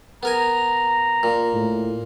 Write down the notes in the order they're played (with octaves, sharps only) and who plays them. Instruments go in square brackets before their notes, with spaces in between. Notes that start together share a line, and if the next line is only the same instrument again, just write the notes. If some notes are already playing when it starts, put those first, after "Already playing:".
[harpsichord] B3 A#4 G#5 [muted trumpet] A#5
[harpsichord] A#2
[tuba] A2